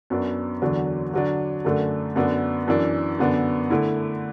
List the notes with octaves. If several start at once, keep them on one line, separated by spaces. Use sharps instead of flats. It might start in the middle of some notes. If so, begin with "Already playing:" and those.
F#2 F#3 B3 D4
E2 D3 F#3 D4
D3 F#3 D4
F#2 D3 A3 D4
F#2 D3 B3 D4
F#2 E3 D4
F#2 D3 B3 D4
D3 A3 E4